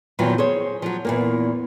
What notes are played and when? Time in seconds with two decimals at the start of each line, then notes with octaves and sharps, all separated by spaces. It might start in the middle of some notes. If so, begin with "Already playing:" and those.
0.19 E2 A#2 D#3 F3 F#3
0.38 G#4 C5 C#5
0.82 F3 F#3
1.05 E2 A#2 A#3